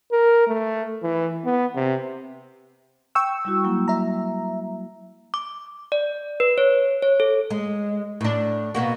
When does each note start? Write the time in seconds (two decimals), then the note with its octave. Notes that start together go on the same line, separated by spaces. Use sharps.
0.12 A#4
0.47 A3
1.03 E3
1.45 B3
1.75 C3
3.15 G5 C#6 E6
3.45 G3 E4 F#4
3.64 F#3 A#3 E4
3.88 E5 A#5
5.34 D6
5.92 D5
6.40 B4
6.58 C#5
7.02 C#5
7.20 A4
7.50 G#3
8.21 A2 D4
8.75 B2 A#3 F#4